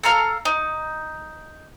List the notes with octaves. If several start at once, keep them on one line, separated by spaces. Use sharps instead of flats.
A4 F5 A#5 F6
D#4